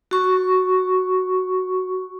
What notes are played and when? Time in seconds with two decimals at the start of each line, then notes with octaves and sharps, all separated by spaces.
0.11 F#4 C#6